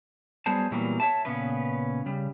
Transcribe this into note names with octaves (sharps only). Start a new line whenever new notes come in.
F#3 G3 B3 G#4 C5 A5
A#2 E3 F#3 G3 A#3 B3
C#5 E5 A5
A#2 C#3 B3 C#4 B4
C#3 G3